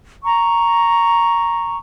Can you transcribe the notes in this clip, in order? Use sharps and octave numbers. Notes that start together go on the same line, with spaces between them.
A#5 C#6